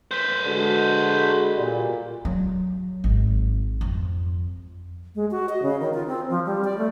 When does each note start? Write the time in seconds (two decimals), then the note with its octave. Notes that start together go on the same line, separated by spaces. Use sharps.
0.11 B4 C5
0.45 D3 G#3 F#4
1.57 A#2 G3
2.25 F#3
3.04 G#1
3.81 F2
5.15 G#3
5.31 F#4
5.49 D#5
5.62 C#3
5.80 D#3
5.94 F4
6.07 C4
6.29 F3
6.46 G3
6.65 D5
6.78 A3